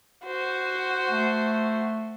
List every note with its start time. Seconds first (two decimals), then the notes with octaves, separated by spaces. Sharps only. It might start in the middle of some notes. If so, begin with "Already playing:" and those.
0.25 F#4 C5
1.10 A3